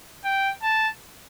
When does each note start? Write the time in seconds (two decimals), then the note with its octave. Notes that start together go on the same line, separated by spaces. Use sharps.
0.25 G5
0.63 A5